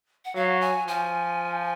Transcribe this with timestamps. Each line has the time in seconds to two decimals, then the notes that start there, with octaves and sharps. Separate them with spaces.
0.25 F#5
0.35 F#3 F5
0.61 G#5
0.87 F3 G#5